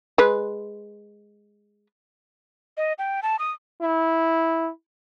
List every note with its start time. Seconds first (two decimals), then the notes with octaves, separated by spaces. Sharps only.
0.18 G#3 B4
2.77 D#5
2.98 G5
3.23 A5
3.39 D#6
3.82 E4